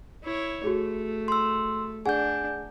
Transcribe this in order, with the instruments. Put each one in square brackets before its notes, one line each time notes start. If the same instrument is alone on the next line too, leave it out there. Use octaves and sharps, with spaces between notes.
[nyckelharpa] E4 C#5
[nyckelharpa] A3 [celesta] F#4 G#4
[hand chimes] C6 E6
[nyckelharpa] D4 [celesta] G#4 F#5 [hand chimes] G#5 G6